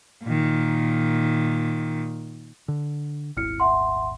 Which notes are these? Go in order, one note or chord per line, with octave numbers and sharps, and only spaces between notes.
A#2 D#3
D3
D#1 G#1 E4 F6 C#7
E5 F#5 C6